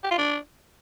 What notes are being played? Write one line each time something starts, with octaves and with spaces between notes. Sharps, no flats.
G4
F4
D4